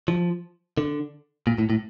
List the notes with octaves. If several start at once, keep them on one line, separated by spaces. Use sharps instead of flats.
F3
D3
A#2
A2
A2